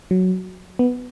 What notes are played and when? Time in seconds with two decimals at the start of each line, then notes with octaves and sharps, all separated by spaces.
0.11 F#3
0.79 B3